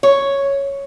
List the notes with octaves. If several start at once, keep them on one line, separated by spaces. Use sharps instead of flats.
C#5